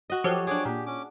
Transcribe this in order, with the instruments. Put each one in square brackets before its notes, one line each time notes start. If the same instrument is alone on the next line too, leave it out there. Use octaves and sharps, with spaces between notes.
[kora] F#4 D#5
[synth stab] F3 F#3 G4 [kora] A4 C#5
[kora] D4 G#4 [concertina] C#5 D6
[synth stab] A#2 [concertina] G4
[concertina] C#4 D6